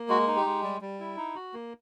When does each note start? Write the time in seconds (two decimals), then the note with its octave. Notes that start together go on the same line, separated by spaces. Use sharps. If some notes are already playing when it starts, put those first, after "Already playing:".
Already playing: A#3
0.09 G#3 F#4
0.28 D#4
0.36 G4
0.45 G#3
0.64 G3
0.81 G3
1.00 E4
1.17 D#4
1.35 F#4
1.54 A#3